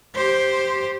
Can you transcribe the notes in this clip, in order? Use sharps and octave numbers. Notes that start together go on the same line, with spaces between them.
G4 C5